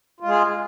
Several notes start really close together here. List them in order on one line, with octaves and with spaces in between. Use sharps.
F4 G#3 G#4